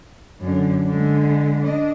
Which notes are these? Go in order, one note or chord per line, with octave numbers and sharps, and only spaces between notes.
F#2 D3
D3 G#3
D4 D#5